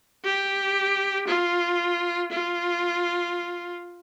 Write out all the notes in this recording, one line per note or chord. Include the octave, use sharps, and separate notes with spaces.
G4
F4
F4